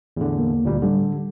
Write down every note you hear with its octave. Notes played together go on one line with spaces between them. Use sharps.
E2 A2 D3
A#3
D2 A#2 G3
A2 D3 G3